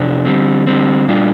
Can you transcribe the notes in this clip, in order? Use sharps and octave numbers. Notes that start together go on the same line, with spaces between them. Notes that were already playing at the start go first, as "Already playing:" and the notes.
Already playing: F2 C3 D4
D3 G3 C4
D3 G3 C4
A#2 G3 D4 F4